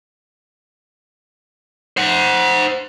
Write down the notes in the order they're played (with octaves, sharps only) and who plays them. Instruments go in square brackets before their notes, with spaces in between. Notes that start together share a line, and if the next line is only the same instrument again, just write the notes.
[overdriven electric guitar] C5 F#5